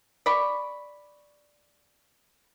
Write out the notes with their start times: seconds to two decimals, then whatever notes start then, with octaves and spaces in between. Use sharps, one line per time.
0.26 D5 B5 C#6